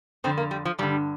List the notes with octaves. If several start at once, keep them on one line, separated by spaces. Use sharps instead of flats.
F2 D3 C4
A#3
G3
F3
G2 D3 G3